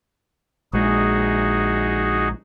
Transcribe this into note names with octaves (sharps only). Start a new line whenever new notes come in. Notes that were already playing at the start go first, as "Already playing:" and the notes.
A#1 G#3 D#4 F#4 G#4